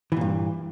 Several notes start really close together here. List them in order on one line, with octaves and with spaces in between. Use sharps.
E3 A#2 G2